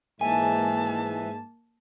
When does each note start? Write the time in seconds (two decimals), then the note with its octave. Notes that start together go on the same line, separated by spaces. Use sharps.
0.21 G#2 E3 A#3 E5 G#5 A5